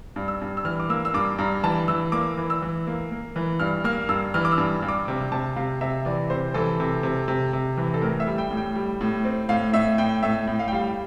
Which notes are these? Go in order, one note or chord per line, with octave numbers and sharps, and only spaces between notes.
G2
E6
G2
E6
E3 F6
D6
A#3 E6
E6
G2 D6
G2 A#5
E3 A5
E3 E6
A#3 D6
E3
E6
E3
A#3
A#3
E3
G2 F6
A#3 F6
G2 E6
E3 F6
D6
E6
G2
G2
D6
C3
C3 A5
C3 F5
C3 E5
E3 D5
C3 C5
E3 A4
C3
C3
C3
C3
E3
A4
A2 A#4
E5
G3
G5
A2
G5
G3
A2
C4
A2 F5
A2 E5
A2 G5
A2 E5
A2
F5
G5
G3 F5